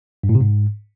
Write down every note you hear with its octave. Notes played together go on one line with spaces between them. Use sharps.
G2
A2
C3
G#2